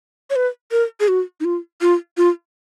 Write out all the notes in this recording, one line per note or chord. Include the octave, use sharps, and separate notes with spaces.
C#5
B4
A#4
G#4
F#4
D#4
F4
F4
F4